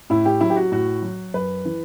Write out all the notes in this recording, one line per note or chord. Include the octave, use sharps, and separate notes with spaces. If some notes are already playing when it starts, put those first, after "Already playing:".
A2 E4
G4
F#3 E4
G4
F#4
A2 F#4
F#3
F#2 B4
E3